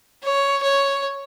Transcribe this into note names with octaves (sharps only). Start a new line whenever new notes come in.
C#5
C#5